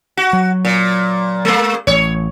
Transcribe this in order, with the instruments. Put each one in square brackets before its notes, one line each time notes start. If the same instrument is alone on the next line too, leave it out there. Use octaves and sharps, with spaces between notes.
[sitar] F#4
[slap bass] F#3
[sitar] A#2
G#3 A#3
[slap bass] A1 [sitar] C#5